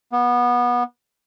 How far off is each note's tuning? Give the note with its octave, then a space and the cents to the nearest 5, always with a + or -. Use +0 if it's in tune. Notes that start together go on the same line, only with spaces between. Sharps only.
B3 -20